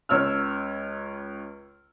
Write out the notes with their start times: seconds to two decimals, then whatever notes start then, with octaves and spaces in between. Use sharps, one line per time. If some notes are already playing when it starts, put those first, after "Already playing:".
0.09 C#2 C#5 E6 F6